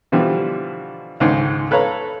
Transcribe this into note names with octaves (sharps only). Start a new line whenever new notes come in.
B2 D3 E3 F3 G3
C#2 G#2 D3 D#3
A4 B4 C#5 F5 A#5